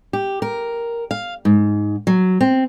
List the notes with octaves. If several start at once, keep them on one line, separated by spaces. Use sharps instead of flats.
G4
A#4
F5
G#2
F#3
C4